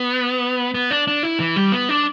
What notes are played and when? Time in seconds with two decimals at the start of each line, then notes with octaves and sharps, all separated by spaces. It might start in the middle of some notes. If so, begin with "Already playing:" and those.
Already playing: B3
0.74 B3
0.91 D4
1.07 D4
1.23 E4
1.40 E3
1.56 G3
1.72 B3
1.89 D4